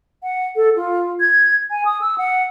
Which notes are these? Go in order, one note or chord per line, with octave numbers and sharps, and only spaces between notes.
F#5
A4
F4
G#6
G#5
D#6
E6
F#5